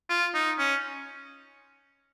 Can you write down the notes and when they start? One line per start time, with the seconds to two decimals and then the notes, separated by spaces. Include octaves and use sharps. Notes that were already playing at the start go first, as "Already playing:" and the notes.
0.09 F4
0.34 D#4
0.58 C#4